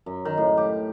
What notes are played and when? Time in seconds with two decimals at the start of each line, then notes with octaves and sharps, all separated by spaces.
0.06 F#2
0.25 D#3
0.37 A2
0.57 G4